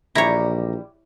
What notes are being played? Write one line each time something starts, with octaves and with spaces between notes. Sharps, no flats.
A#1 E3 G3 E4 G4 C#5 A#5